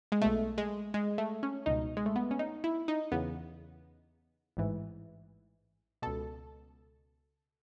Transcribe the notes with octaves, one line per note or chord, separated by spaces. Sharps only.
G#3
B1 B2 A3
G#3
G#3
A3
C#4
C#2 B2 D#4
G#3
A3
B3
C#4
D#4
E4
D#4
E2 C#3 E3 B3
A1 G#2 E3
C#2 B2 A4